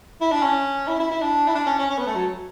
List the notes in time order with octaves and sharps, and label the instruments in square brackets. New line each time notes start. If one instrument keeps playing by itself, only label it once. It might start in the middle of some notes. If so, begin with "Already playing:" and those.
[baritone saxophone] E4
D4
C#4
E4
E4
E4
D4
E4
D4
C#4
C#4
C#4
B3
A3
F#3